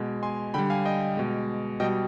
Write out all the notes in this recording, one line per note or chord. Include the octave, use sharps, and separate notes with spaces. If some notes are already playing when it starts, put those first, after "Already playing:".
Already playing: B2 G#3
G#5 C6
D3 G3 G5 B5
F5 G#5
D#5 G5
B2 G#3
B2 G3 D#5 G5